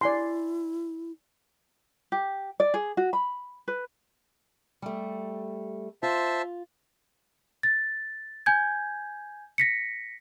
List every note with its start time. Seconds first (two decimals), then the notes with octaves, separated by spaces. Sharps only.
0.01 E4 D5 G#5 C6
2.12 G4
2.60 D5
2.74 G#4
2.97 F#4
3.13 B5
3.68 B4
4.82 G3 A3
6.03 F4 C5 E5 A5
7.63 A6
8.46 G#5 G6 G#6
9.58 A#6 B6 C#7